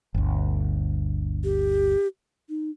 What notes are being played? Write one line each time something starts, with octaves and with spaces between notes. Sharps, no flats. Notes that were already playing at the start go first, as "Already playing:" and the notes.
G1 D2
G4
D#4